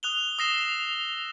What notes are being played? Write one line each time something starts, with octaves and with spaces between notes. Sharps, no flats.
D#6 F#6 F7 G7
D#6 E6 A#6 C7 E7 G7